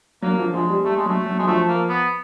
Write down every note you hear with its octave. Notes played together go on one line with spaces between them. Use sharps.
F#3 A#3
F3
F3 G#3
G3
G3 A3
G#3
F#3 A3
F#3
F#3 G#3
F3 A3
A#3
B3